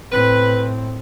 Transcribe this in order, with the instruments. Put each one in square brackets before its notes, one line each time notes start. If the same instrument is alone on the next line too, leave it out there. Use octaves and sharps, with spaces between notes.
[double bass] A2 C4 [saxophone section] B4